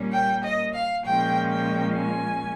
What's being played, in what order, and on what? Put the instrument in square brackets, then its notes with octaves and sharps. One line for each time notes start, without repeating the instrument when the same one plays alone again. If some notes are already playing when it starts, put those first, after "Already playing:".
Already playing: [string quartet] A#2 G3 A#3 C#4
G5
D#5
F5
A#2 F3 G#3 C#4 G5
G5
G#5